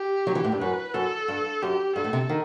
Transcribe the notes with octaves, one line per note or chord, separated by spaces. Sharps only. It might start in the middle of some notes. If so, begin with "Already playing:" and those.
Already playing: G4
F#3
E3
A2
G2
F#2 B4
F#2 A4
G2
F#2 G4
G2 A4
A2
C3
D#3